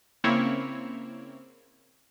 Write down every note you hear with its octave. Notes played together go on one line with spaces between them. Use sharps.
C#3 A#3 C4 E4 C#5